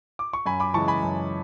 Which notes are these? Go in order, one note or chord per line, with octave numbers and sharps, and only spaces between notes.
D6
C#6
F#2 G#5 B5
B5 D6
C#3 E3 G#3 A5 C#6
G#5 B5
F#2